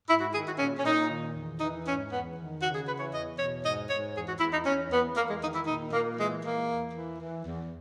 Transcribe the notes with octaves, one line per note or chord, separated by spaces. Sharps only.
G#2 E4
F#4
D#3 G#4
F#4
A#2 C#4
C#4
A#2 D#4
D#3
E2
E3 D#4
G#2 C#4
E2 B3
D#3
C#3 F#4
G#4
E3 B4
C#5
E2 D#5
B2 C#5
G#2 D#5
G#2 C#5
E2 G#4
F#4
E2 E4
D#4
E2 C#4
E2 B3
E2 A#3
G#3
D#3 D#4
E4
A#2 D#4
A#2 A#3
E3 G#3
E3 A#3
E2
E3
E3
E2